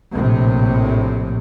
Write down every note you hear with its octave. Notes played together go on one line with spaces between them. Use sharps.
A#1 A2 C3